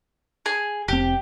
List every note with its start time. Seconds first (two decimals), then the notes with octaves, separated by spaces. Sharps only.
0.46 G#4
0.88 F1 C4 G4